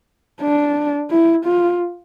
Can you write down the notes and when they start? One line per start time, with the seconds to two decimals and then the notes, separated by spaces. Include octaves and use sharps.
0.42 D4
1.11 E4
1.46 F4